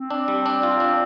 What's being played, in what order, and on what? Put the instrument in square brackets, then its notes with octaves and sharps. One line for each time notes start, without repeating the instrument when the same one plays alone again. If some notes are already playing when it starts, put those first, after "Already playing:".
Already playing: [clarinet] C4
[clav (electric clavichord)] D4
G3
D4
F4
D4